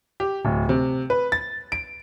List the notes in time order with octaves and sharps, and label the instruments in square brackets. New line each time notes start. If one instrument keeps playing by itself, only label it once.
[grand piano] G4
D1
C3
B4
A6
D7